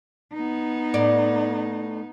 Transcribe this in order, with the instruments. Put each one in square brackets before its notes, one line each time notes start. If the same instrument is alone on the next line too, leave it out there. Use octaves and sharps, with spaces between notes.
[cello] B3 D#4
[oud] A2 D5